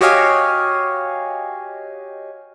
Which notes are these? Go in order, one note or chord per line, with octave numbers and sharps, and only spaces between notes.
F#4 G4 C#5 D#5 F5 G#5